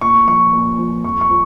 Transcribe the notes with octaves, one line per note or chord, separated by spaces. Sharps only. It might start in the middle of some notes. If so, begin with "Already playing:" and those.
A#2 C#6
F3 C#6
A#2
F3
F2 C#6
C#6
F3